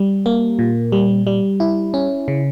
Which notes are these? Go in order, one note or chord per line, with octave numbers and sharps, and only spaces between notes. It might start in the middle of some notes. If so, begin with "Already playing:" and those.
Already playing: G3
A#3
A#2
G3
G3
E4
C#4
C#3